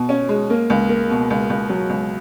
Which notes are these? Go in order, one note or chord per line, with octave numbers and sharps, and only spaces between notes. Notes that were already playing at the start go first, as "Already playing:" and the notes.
Already playing: B2
C#4
G#3
A#3
C#2
A#3
B2
C#2
C#2
F#3
C#2